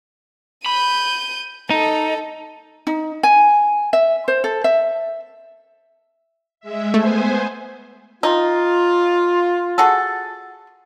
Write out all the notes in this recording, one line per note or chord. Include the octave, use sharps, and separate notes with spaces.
B5 G6 D#7
D#4 A4
D#4
G#5
E5
C5
A4
E5
G#3 E5
A3 B3 C5 G#5
D#4 F4
F#4 G#4 A4